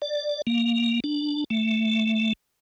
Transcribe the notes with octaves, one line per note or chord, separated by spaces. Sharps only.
D5
A#3
D4
A3